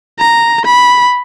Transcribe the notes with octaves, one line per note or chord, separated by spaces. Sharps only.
A#5
B5